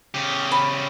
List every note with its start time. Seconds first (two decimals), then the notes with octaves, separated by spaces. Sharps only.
0.14 C#3 G4
0.52 B5